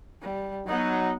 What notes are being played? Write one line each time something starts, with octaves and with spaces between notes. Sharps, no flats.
G3
F#3 B3 D#4 F#5